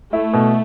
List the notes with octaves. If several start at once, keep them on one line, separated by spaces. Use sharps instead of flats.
A3 E4
B2